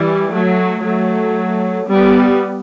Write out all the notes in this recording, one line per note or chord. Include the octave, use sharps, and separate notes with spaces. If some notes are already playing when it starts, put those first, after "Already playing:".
Already playing: E3 G3
F#3 A3
F#3 A3
G3 B3